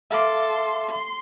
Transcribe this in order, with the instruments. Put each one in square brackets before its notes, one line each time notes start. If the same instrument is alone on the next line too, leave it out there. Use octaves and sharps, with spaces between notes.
[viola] A4 C6 [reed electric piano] E5 F5 D6
[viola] C6